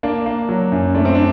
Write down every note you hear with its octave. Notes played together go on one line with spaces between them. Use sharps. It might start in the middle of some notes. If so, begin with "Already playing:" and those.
A#3 D4
A#3
F#3
F#2
A3 D4
C4
D4